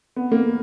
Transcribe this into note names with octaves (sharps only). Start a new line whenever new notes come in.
B3
A#3